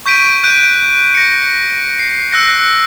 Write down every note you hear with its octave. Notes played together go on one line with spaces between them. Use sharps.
C#6 G6 B6 D7 D#7
F#6 G6 D7 D#7
A#6 C#7
C7
E6 F#6 A#6 C#7